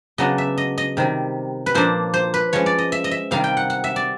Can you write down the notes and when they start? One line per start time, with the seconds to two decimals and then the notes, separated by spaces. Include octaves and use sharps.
0.18 C#3 F#3 B3 D4 D#5
0.38 E5
0.58 D#5
0.78 D#5
0.97 C3 D#3 G3
1.66 B4
1.75 A#2 F3 A#3 D4 C5
2.14 C5
2.34 B4
2.53 F3 G#3 C#4 C#5
2.66 D5
2.79 D#5
2.92 E5
3.04 D#5
3.11 E5
3.31 C3 D#3 G3 C4 F5
3.44 G5
3.57 F#5
3.70 F#5
3.84 E5
3.96 D5